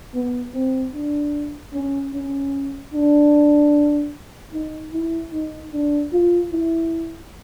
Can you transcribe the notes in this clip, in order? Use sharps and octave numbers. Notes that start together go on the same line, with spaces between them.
B3
C4
D4
C#4
C#4
D4
D#4
E4
D#4
D4
F4
E4